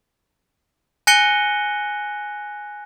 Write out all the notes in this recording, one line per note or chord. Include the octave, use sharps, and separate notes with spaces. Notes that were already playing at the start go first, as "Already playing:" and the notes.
G#5 F#6 A#6 C#7 D#7 G7